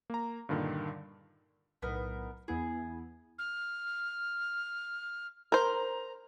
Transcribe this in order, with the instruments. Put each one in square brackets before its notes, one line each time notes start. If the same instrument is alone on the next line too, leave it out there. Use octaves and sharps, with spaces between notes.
[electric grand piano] A#3 A#5
G2 A#2 D3 D#3
[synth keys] B1 A2 [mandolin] B3 D#4 A#4
[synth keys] E2 B3 E4 [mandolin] G#4
[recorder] F6
[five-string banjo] A#4 C5 [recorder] A#5